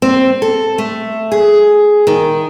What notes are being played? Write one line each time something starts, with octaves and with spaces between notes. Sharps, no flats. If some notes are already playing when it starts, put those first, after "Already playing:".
C4
A4
A3
G#4
D#3